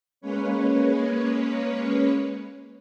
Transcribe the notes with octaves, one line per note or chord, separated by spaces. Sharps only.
G#3 A#3 C#4 B4 C#5